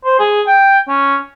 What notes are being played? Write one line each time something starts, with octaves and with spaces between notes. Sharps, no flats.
C5
G#4
G5
C#4